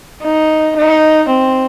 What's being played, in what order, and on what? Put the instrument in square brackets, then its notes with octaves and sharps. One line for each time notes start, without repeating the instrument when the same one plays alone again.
[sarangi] D#4
D#4
C4